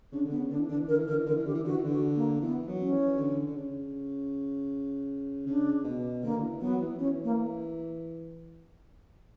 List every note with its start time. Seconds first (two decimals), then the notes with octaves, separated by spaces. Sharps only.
0.12 C#3 D4
0.25 D3
0.31 B3
0.38 C#3
0.51 D3 D4
0.59 E3
0.69 D3 D4
0.79 E3
0.88 D3 A#4
0.98 E3
1.08 D3 A#4
1.17 E3
1.26 D3 A#4
1.35 E3
1.46 D3 G4
1.54 E3
1.64 D3 F#4
1.74 E3
1.84 D3
1.91 F#4
2.16 A#3
2.41 E3 B3
2.67 F#3
2.79 C#4
2.92 E3
3.17 D3
3.46 D3
3.56 C#3
5.46 C#3 D4
5.84 B2
6.23 D3 A#3
6.35 D3
6.43 E3
6.61 F#3 B3
6.80 E3
6.99 E3 C#4
7.24 A#3